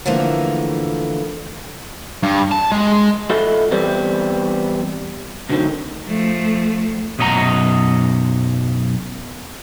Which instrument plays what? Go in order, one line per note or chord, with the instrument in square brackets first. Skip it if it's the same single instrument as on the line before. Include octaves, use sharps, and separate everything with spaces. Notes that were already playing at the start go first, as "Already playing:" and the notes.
[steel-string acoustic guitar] D3 E3 F3 A3 A#3
[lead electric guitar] G2
A5
G#3
[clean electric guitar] E4 F4 A4 D#5 F#5
E2 E3 G3 B3 C4
D2 D3 D#3 F3 F#3 C4
[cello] F3 A3
[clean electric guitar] B1 F#2 D#5 F#5 A#5